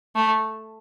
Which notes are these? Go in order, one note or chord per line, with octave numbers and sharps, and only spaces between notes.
A3